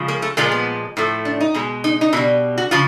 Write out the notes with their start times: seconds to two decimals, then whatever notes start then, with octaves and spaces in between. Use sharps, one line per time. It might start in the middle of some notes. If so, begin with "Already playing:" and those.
Already playing: C#3 F3 G#3
0.08 A#3
0.22 A3
0.37 A#2 F3 G#3 A#3
0.52 B3
0.97 A2 F3 A3
1.25 D4
1.40 D#4
1.54 B2 G#3
1.84 D#4
2.01 D#4
2.13 B2 E4
2.17 G3
2.58 F#4
2.71 C#3 F3 F4